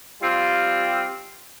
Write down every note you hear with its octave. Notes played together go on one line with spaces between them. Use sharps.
G3 C4 F4